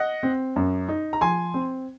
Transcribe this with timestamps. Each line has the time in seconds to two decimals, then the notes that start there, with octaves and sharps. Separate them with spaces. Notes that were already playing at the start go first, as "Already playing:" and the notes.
Already playing: D#5 F#5
0.23 C4
0.56 F#2
0.89 D#4
1.13 A#5
1.21 F3 G#5 C6
1.54 C4